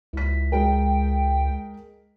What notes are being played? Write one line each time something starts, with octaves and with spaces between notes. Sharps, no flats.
C#2 E4 B6
G#3 A#4 G5